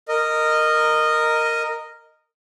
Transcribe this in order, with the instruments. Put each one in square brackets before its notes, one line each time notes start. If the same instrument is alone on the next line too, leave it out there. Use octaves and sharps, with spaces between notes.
[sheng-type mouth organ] A#4 D#5